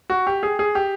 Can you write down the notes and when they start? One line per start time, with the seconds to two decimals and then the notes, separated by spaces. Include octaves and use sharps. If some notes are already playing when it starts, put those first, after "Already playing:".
0.10 F#4
0.27 G4
0.43 G#4
0.59 G#4
0.75 G4